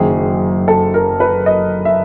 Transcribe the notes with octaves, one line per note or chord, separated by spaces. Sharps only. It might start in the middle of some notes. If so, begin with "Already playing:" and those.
Already playing: F#1 F#2 D#3 G#4
A4
A#4
B4
D#5
E5